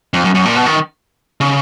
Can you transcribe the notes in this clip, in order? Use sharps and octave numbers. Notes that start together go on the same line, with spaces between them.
F2
F#2
F#2
A#2
B2
D#3
C#3